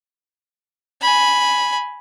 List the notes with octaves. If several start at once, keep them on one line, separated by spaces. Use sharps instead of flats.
G#5 B5